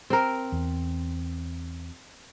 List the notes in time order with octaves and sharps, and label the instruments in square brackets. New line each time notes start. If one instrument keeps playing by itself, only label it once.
[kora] C4 A#4
[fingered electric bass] E2